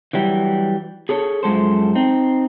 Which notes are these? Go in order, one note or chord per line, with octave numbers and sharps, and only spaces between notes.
E3 F#3 G3
G#4 A4 C#5
F#2 F3 G#3 A4 C5
C4 D#4